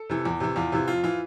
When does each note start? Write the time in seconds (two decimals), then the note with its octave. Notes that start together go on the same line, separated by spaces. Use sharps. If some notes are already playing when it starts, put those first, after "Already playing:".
Already playing: A4
0.09 C3 E3
0.25 E2
0.40 C3 E3
0.56 E2 F4
0.72 C3 E3
0.87 F2 F4
1.03 E3 F4